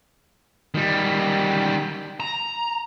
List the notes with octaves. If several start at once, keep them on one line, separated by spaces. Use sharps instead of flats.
D#3 G3
A#5